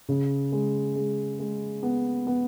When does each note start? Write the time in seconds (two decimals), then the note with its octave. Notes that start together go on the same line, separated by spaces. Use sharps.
0.09 C#3
0.52 G#3
0.96 G#3
1.39 G#3
1.83 B3
2.27 B3